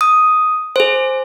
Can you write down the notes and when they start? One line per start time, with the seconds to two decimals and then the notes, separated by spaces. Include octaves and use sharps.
0.01 D#6
0.76 G#4 C5